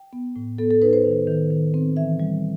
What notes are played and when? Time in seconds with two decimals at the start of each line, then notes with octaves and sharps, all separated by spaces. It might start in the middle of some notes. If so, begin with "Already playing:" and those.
Already playing: G5
0.13 B3
0.36 A2
0.58 B3 A4
0.71 A4
0.82 D#4 B4
0.93 C5
1.05 D#3
1.27 D#3
1.51 D#3
1.74 C4
1.97 E3 E5
2.20 G3